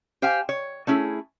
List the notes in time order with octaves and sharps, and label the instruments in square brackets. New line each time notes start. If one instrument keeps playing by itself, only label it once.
[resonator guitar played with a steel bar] G4 C5 F5 G5 G#5
C#5
A3 C#4 E4 G#4